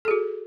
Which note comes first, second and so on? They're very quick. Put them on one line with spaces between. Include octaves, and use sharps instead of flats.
A4 G#4 F#4